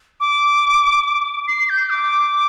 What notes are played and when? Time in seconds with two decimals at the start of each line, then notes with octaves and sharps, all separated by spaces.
0.20 D6
1.48 C7
1.70 G6
1.90 D6